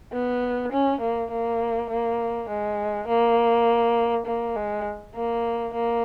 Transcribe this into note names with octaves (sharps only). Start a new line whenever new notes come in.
B3
C#4
A#3
A#3
A#3
G#3
A#3
A#3
G#3
A#3
A#3